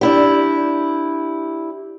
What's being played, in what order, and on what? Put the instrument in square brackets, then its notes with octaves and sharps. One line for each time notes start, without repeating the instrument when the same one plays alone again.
[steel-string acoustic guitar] D4 E4 G4